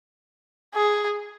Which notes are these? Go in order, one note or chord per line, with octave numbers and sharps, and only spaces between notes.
G#4